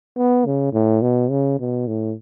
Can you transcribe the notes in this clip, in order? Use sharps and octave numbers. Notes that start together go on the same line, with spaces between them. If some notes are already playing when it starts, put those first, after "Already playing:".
B3
C#3
A2
B2
C#3
B2
A2